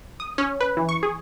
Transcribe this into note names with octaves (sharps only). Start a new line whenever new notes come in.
D#6
C#4
B4
E3
C#6
G#4